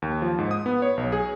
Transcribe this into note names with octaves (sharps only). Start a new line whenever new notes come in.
D#2
F3
G#2
D#6
B3
C#5
B1
G#4